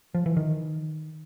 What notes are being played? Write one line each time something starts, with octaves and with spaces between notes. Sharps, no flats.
F3
E3
D#3